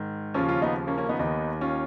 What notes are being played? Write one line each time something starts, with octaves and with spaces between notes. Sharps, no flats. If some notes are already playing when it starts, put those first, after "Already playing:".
Already playing: G#2 D#3
D#2 C#3 F3 C#4 F4
C#4 F4
B3 D#4
A#3 C#4
A#3 C#4
B3 D#4
D#2 D#3 B3 D#4
C#4 F4